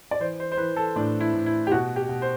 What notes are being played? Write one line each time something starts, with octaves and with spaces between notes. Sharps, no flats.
D5
E3 C5
C5
C5
E3 B4
A4
A2 D4
E4
A2
E4
G4
B2 F#4
G4
B2
C5